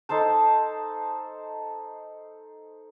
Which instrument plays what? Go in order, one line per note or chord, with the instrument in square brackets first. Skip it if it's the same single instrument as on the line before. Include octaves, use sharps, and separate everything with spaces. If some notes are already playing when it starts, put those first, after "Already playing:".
[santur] D#4 A4 C5 A5